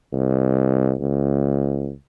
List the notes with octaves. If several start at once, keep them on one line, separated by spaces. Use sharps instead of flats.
C2
C#2